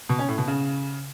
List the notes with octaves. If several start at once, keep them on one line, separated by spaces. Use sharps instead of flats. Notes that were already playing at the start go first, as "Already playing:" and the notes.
B2
C#4
A2
B2
C#3